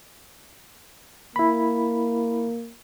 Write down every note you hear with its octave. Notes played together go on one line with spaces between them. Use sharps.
A#3 E4 B5